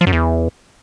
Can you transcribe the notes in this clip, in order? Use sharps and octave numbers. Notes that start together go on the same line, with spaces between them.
F3
F#2
E2